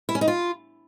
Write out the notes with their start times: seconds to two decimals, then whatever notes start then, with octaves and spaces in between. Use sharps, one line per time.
0.09 E4
0.15 C#4
0.21 D#4
0.28 F4